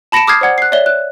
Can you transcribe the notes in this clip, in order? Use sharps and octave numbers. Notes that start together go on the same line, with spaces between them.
A5 B5 A#6 C#7 D7 E7
D6 D#6 F6 G6 G#6 C7
C5 D5 F#5 G#6
F#6 C7
C#5 D5 E5 G7
F#6